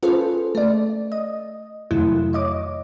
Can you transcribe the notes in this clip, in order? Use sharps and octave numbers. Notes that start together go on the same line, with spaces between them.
C#4 F4 G#4 A4 B4 C5
A3 D5
D#5
F2 C3 D#3 F#3 A3 E4
C#5 D#5 D6